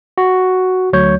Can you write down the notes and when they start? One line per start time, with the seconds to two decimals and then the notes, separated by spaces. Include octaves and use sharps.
0.18 F#4
0.93 D2 F#3 C#5 G6